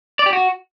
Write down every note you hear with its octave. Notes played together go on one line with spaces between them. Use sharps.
D5
G4
F#4